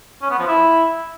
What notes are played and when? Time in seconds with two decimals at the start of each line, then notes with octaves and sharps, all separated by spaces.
0.22 C#4
0.30 B3
0.39 F3
0.47 E4